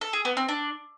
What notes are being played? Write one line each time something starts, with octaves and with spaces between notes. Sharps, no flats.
A4
G#4
B3
C4
D4